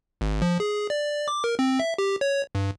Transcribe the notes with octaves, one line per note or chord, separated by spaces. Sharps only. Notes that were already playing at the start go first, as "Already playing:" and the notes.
G#1
F3
G#4
D5
D6
A#4
C4
E5
G4
C#5
G2